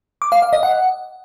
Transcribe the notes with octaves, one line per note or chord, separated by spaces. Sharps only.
D6
F5
F5
D#5
F#5